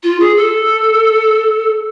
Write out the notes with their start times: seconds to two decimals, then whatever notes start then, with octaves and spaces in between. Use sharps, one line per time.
0.03 F4
0.19 G#4
0.36 A4